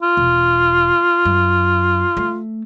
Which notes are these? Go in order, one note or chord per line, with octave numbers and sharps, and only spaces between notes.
F4
E1
F#2
A3